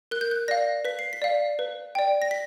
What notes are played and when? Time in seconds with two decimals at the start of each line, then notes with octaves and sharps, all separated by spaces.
0.11 A#4 F#6
0.21 G6
0.31 F#6
0.48 D5 F5 A#6
0.85 B4 B6
0.99 C7
1.13 B6
1.22 D5 F5
1.59 B4
1.95 D5 G5
2.22 A#6
2.31 B6